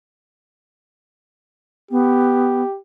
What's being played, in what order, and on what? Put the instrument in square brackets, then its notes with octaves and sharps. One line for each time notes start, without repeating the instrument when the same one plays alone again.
[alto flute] B3 [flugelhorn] G4